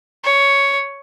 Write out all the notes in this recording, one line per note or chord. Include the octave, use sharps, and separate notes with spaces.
C#5